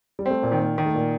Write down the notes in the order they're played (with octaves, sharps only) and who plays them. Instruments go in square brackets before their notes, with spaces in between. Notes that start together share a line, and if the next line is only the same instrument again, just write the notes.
[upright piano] G3
[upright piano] A3 [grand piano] C4
[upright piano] A#2 A#3
[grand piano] D#3
[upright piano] A#2 A#3
[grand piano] D#3 [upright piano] A#3
[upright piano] A3
A#2 A#3